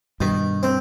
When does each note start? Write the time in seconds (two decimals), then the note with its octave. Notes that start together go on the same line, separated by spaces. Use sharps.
0.20 G2 B2 D#3
0.63 C4